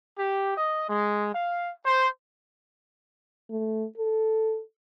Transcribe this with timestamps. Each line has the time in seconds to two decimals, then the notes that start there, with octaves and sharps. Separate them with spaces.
0.17 G4
0.57 D#5
0.88 G#3
1.33 F5
1.85 C5
3.50 A3
3.98 A4